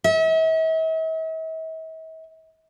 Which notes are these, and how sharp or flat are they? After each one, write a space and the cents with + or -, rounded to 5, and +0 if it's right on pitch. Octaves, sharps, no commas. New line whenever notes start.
E5 -45